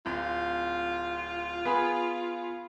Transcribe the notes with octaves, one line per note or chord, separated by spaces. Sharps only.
D1 F4
B3 G#4 B5